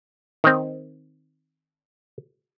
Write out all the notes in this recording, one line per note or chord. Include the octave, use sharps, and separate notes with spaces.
D#3 C4